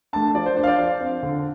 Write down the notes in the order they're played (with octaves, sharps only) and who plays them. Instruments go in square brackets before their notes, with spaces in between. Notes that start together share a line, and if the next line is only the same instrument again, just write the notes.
[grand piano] A3 D4 A5
F3 D5
C5
D4 C5
F5
D5
F3 F5
C4
D3